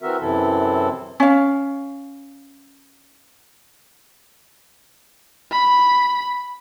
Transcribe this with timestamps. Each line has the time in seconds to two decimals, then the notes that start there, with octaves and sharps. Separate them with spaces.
0.02 E3 C4 F#4 A#4 E5
0.21 F#2 C3 E3 C4 E4 A4
1.20 C#4 F5
5.51 B5